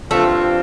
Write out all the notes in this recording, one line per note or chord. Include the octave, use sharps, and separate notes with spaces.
G2 F3 A3 C4 F4